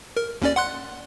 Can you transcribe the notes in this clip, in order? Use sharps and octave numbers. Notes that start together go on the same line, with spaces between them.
A#4
D#2 C#4 D5
F#5 C6 F#6